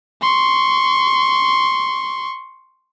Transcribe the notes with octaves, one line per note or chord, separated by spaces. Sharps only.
C6 C#6